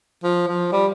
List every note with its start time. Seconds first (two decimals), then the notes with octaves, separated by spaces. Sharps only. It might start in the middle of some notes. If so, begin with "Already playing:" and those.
0.24 F3
0.47 F3
0.72 G3